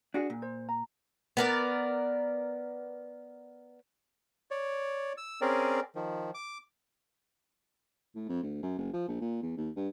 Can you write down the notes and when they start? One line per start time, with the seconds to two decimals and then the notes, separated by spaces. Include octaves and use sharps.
0.14 D4 F#4 G#4
0.30 A#2
0.42 C5
0.69 A#5
1.37 B3 A#4 D5
4.51 C#5 D5
5.18 E6
5.41 C4 C#4 G#4 A#4 D5
5.95 D#3 F3
6.34 D6
8.15 A2
8.29 F2
8.43 D2
8.63 F#2
8.78 F#1
8.93 F3
9.08 A#1
9.21 A#2
9.42 E2
9.57 D#2
9.76 G2